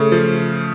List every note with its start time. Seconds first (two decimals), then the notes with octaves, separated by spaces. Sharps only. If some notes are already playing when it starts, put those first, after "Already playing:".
Already playing: C#3 A3
0.12 F3